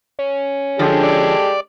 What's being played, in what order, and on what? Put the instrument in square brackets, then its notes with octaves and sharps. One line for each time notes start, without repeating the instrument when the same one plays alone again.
[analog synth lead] C#4
[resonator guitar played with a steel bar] D3 F3 [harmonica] G#3 G4 A4
[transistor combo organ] D5